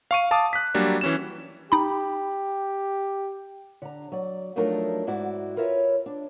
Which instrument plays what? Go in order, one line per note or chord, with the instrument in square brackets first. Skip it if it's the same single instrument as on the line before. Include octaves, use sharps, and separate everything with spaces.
[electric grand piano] F5 C#6 D#7
F5 A5 D6 D#6
F#6 B6
F#3 G3 A#3 D4
E3 C#4 E7
[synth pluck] D#4 B5 [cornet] G4
[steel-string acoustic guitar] D3 A#5
F#3 D5
F3 F#3 A3 D4 D#4 A#4
G#2 E4 F#4 D5
F4 A#4 B4 C#5 E5
D4